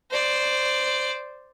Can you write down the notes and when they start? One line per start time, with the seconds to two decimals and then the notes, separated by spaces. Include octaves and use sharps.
0.11 C5 D5